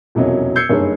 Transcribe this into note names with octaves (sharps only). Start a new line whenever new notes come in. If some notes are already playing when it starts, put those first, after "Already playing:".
E1 C2 F2 F#3 C#4 D#5
E6 G6 G#6 C7 C#7
F#1 G2 D#4 G#4 C#5 E6